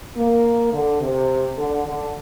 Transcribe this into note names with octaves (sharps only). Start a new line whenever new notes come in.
A#3
D3
C3
D3
D3